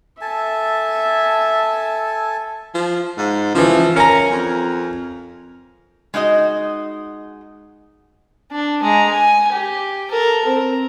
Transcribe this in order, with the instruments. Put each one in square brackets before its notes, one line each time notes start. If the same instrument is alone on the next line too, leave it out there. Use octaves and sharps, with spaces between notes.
[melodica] A4 G#5 A5 [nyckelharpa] E5
[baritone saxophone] F3
G#2
[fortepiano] C#3 E3 [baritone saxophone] F3
[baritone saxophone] C#4 [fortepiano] A#4 G#5 A#5
[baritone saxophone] F2
[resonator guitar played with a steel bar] G#3 D#4 F#4 D#5
[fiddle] D4
G#3 A#5
G#5
G4
A4 A#4
C4 A#4